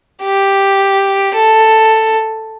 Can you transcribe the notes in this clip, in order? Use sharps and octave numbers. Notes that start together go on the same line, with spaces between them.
G4
A4